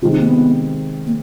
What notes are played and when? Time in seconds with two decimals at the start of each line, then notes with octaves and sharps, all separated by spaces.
0.02 C3 D#3 G#3 C4 F4
0.11 D#4
0.20 A#3
0.28 B3
1.07 A#3